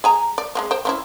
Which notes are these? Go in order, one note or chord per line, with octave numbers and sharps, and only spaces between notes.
G#4 G#5 A#5
D5
G#3 A#3 C4
C5 G5
C4 C#4 E4